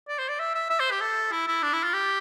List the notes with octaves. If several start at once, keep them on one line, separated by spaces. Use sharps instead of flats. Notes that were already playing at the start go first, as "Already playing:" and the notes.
D5
C5
D5
E5
E5
E5
C5
G4
A4
E4
E4
D4
E4
F4
G4